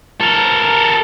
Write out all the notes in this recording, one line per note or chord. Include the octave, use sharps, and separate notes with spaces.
A4 A#4